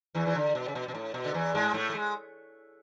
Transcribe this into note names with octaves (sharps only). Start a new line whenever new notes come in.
E2 E3
E3
D3
B2
C#3
B2
B2
A2
B2
D3
E2 E3
G#2 G#3
A2 A3
A3
G#3